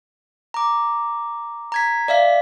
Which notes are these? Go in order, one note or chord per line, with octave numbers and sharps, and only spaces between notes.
A#5 D6
A#5 G#6 B6
D5 E5 F5 B6